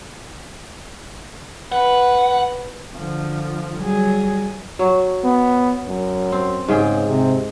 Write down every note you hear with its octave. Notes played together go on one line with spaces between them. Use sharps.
B4 F#5
D3 F3
F#3 G3 G#4
F#3 C#5
B3
F#2
C4
G#2 C#3 G#4 G5
C3